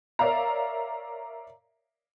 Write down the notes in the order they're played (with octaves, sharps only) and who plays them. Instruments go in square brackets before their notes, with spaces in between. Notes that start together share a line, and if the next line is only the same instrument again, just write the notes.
[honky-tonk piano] A#4 C#5 D5 E5 F5 A#5